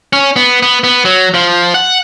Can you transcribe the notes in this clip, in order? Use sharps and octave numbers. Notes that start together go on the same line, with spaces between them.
C#4
B3
B3
B3
F#3
F3
F#5